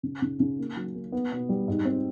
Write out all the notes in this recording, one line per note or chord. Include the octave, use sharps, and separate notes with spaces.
C#3
C#3
C#3
A#3
F#3
A#3
B3
B2
G3
G#2
C4